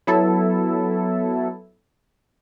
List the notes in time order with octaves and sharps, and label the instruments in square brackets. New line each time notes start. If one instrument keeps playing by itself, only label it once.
[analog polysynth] F#3 B3 E4 A4